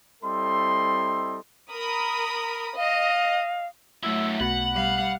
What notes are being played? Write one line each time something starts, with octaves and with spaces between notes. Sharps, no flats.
G3 C4 E4 A4 D#5 C6
A#4 B5 D#6
D#5 F5
F#3 A3 E4 E6
B1 B2 F#5 B5 F#7
G3 F5